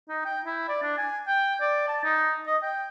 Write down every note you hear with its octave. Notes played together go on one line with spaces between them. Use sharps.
D#4
G5
E4
D5
D4
G#5
G5
D5
A5
D#4
D#5
G5